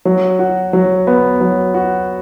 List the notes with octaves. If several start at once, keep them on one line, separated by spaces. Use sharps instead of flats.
F#3
F#4
F#3
B3
F#3
F#4